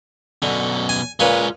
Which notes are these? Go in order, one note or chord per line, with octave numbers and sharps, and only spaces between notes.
F#2 B2 D3
G#5
A#2 G#3 C#4 F4 B4